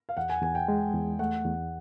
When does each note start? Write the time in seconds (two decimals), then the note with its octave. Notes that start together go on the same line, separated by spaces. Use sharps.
0.09 F5
0.17 E2 F#5
0.30 G#5
0.42 E2 G#5
0.55 G5
0.68 G#3
0.94 E2
1.19 A3 F#5
1.45 E2